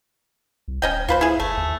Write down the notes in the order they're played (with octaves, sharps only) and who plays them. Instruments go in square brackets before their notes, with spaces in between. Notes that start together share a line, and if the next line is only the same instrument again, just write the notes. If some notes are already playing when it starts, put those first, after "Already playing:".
[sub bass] C2
[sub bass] D1 [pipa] C#4 D#5 G5
[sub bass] D2 [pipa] F4 B4 C5
[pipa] E4 G#4
[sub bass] G1 [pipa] A3
[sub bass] D#2